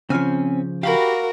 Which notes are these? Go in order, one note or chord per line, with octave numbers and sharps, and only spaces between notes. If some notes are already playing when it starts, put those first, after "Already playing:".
C#3 F3 C4 C#4 G#5 F6
F#4 G4 A#4 F5 B5 D6